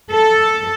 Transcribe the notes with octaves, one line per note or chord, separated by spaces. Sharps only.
A4